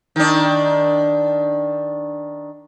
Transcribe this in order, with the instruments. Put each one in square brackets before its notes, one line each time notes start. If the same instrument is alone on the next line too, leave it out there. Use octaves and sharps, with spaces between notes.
[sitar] D#3 D4